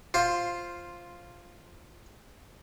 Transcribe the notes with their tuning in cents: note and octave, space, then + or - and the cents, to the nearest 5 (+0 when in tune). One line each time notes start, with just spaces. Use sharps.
F4 +0 C5 +10